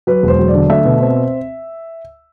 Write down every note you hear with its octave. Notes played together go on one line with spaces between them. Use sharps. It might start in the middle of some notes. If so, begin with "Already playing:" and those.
F#3 B4
E1 C5
F#3
D5
D3
A3 E5
B2
C4